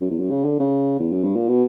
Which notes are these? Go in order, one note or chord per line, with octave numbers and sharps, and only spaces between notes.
F#2
E2
F#2
C#3
D3
C#3
E2
F#2
G2
A#2
B2